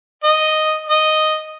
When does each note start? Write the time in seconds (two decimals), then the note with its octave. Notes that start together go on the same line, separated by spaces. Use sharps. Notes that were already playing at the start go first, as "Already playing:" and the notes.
0.24 D#5
0.89 D#5